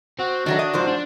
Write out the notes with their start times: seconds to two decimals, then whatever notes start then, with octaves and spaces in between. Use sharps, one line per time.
0.19 C4 F#4
0.46 D#3 F#3 A3 D4
0.59 D#5
0.74 G#2 F3 C5
0.88 D4